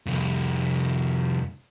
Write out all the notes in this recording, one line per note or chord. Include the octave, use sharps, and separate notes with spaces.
C2 F2